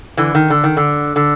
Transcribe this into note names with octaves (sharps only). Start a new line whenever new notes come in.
D3 E3
D#3
D3
D#3
D3
D3